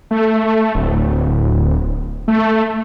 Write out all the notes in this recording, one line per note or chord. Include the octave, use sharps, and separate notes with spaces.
A3
D1
A3